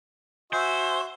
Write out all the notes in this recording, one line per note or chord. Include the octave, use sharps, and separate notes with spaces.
F#4 C5 E5 G#5